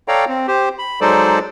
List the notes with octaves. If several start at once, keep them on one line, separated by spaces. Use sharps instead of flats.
A4 C#5 D5 F5 G5 A#5
C4
G4 C5
B5
F#3 G#3 D#4 A4 C5 D5